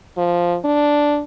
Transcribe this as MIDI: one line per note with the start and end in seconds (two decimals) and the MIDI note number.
0.18 0.57 53
0.65 1.22 62